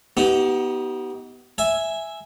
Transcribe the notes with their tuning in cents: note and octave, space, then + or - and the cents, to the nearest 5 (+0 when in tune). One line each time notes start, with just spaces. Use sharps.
B3 +0 D#4 +30 G4 -30
E5 +0 G#5 +0